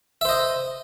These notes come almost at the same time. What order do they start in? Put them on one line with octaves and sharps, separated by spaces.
E5 C5 D#5